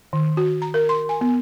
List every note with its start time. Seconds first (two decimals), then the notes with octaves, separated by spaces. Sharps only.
0.13 D#3
0.37 F#4
0.62 A#5
0.74 A#4
0.89 C6
1.09 G#5
1.21 B3